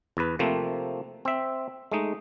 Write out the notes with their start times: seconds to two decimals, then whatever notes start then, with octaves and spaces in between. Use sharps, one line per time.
0.17 E2 B4
0.39 C3 F3 A3 A#3 C4
1.25 C4 E5
1.92 G#3 A3 D#4